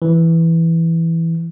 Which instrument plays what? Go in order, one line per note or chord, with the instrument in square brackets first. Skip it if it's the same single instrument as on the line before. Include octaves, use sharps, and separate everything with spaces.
[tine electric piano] E3